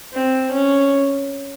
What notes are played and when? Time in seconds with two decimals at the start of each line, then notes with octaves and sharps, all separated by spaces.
0.14 C4
0.52 C#4